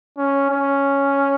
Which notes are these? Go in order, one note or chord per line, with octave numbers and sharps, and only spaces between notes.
C#4
C#4